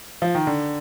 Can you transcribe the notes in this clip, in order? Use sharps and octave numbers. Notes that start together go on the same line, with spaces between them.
F3
D#3
D3